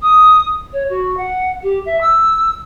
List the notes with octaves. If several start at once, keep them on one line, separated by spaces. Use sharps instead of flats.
D#6
C#5
F#4
F#5
G4
E5
E6